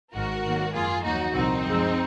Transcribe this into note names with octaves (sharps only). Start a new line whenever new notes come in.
G#1 G#2 D#3 F#4 A#4
G#2 D#3 F#3 A#3
F#2 F3 A#3 F4 G#4
D#2 D#3 F#3 A#3 D#4 F#4
C2 A#2 F3 C4 D#4
F#2 F3 G#3